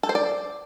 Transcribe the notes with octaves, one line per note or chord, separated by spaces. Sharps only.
A4
C5
D5